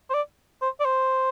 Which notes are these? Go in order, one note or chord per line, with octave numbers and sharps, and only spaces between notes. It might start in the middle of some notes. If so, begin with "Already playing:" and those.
C5
D5
C5
D5
C5